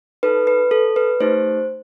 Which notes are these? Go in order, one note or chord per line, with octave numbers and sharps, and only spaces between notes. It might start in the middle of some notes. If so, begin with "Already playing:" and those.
D#4 A4 B4
B4
A4
B4
A3 D#4 G4 C5